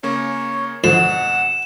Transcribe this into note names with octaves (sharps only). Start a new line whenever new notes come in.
C#3 A#3 C#4 C#5
F2 G#2 B2 D3 F3 F#5 E7